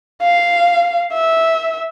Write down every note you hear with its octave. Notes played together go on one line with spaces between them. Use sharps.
F5
E5